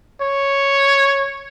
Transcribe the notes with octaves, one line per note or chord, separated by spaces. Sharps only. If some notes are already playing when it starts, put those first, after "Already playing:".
C#5